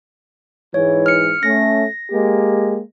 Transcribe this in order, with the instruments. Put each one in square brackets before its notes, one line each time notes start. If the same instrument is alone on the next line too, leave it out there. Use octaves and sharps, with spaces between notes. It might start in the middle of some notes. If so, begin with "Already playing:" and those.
[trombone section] G#2 E3 [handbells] C#5
[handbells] F6 C#7
[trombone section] A3 C#4 [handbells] A#6
[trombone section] G#3 A#3 G4